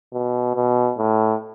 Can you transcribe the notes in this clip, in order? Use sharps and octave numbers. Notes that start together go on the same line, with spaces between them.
B2
B2
A2